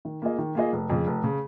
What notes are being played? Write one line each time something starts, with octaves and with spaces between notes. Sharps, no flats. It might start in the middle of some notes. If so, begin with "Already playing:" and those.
D#3
A#3 F4 G#4 D#5
D#3
A#3 F4 G#4 D#5
F1
F2 C#3
F1
C#3